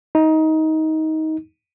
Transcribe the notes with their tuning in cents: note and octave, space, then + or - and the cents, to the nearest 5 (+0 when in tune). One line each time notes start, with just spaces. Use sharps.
D#4 +20